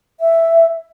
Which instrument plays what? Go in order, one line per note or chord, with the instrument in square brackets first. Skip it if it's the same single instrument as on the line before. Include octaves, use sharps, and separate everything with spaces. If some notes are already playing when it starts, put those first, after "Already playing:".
[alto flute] E5